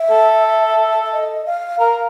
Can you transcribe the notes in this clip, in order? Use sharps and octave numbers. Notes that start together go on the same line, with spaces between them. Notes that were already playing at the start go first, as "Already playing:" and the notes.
Already playing: E5
A4
E5
D#5
F5
A#4 F5